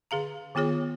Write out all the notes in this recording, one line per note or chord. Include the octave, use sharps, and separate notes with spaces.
D3 G#4 F5 A#5
D#3 B3 F4 G#4 C#5